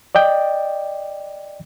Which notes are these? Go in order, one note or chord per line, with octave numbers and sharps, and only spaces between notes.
D5 D#5 G5